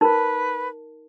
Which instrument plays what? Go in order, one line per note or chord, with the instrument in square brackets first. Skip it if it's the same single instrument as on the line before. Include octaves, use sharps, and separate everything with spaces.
[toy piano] D#4 A#4 [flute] B4